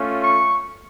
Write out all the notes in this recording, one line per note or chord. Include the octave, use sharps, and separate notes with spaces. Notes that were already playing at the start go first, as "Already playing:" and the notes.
Already playing: A3 C#4 F4
C#6